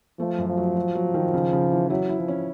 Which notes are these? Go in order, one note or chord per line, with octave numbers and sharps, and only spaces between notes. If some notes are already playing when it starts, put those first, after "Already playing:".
F3 A3
F#2
F3
F#3
F#3
F#3
D#3
C#3
C#3
E3
F#3 E4
E4
F3
C#4